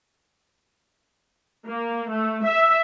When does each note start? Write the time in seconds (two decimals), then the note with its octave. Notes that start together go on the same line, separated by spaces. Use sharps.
1.67 A#3
2.10 A3
2.45 E5